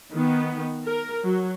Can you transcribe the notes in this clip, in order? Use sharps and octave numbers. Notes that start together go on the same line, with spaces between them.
D#3 B3
A#4
F#3